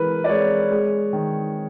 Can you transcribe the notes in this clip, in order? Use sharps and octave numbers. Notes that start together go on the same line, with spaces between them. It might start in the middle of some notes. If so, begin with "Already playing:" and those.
Already playing: E3 G#3 A#4 B4
D5
G#3 C#5
G#3
D#3